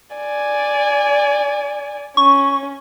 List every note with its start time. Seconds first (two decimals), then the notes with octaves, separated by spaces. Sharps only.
0.16 D5 G#5
2.17 C#4 C#6